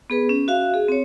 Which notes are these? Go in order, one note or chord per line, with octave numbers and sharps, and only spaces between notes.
B3 G#4 B4
C#4
F#4 E5 F5
G#4
C4 C#5